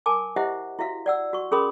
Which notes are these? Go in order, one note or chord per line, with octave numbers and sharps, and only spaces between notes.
A#4 G#5 A5 D6
E4 G4 C5 D#5 E5 F#5
E4 F#4 E5 F5
D5 F#5 E6
F#4 C#6
C#4 G#4 A#4 B5 C6 D#6